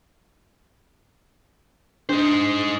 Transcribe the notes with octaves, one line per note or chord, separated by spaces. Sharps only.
D4 D#4 C5